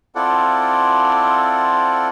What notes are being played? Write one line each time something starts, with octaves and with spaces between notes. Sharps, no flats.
C4 E4 F4 A4 D5 F#5